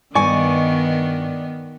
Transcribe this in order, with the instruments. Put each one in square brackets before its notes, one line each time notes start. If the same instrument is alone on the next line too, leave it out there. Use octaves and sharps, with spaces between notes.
[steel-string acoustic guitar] G2 D#5 G#5 [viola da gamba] D#3 B3 [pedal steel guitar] D5 C#6